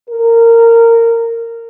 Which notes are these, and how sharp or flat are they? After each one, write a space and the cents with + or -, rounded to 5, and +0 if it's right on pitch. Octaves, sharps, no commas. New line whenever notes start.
A#4 -15